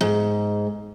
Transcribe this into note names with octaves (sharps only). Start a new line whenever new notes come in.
G#2